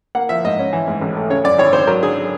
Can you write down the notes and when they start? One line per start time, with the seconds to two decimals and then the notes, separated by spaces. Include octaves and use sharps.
0.15 A#3 F#5
0.29 F3 E5
0.45 G#2 D#5
0.59 C#4
0.73 E3
0.88 G#2
1.01 A1
1.16 A3
1.30 C#3 C#5
1.44 F#2 D5
1.58 G#1 C#5
1.73 G#1 C5
1.87 F#3 A#4
2.03 D3 G#4